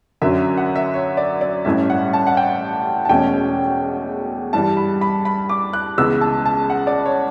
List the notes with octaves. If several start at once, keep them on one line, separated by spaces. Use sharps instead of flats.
F#2 D3 F#3 C#4 E5
F#5
E5
C#5
D5
D5
A1 G2 E3 A3 C#4 E5
F#5
A5
F#5
G5
A5
E1 E2 B2 A3 C#4 G5
G2 E3 G3 A5
B5
B5
B5
D6
F#6
C#2 C#3 E3 B3 E6
A5
A5
F#5
D5
C#5